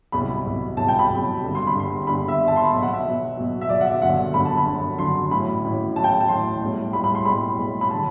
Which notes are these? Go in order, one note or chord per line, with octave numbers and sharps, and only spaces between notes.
C2 B2 F#3 B5
C2 B2 F#3
C2 B2 F#3 A5
G5
B5
C2 B2 F#3
G1 G2 D3
C6
B5
G1 G2 D3 C6
G1 G2 D3 B5
E5
G1 G2 D3
A5
C6
B5
B1 B2 F#3
F#5
E5
B1 B2 F#3
B1 B2 F#3
E5
B1 B2 F#3 D5
F#5
E5
G1 F#2 D3 F#3 F#5
G1 F#2 D3 F#3 B5
A5
B5
G1 F#2 D3 F#3
G1 F#2 D3 F#3 C6
A1 A2 F#3 B5
A1 A2 F#3
A1 A2 F#3 A5
G5
A5
A1 A2 F#3 C6
B1 A2 G3
B1 A2 G3 B5
B5
C6
B1 A2 G3 B5
B1 A2 G3
B5
D3 F#3 A5